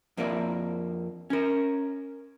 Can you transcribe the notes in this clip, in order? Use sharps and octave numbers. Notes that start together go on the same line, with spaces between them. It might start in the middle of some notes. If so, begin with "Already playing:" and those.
F2 A#3 A#4 D5 E5
C#4 A#4